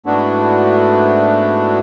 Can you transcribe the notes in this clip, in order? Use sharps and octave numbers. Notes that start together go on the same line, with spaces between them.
G#2 A3 B3 D4 E4 F#4